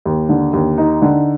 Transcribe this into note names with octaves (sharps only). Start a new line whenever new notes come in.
D#2
D3
D#2
D#4
D3